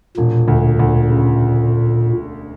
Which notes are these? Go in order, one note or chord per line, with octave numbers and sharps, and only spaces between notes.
E1 A#2
D2
D2
C#3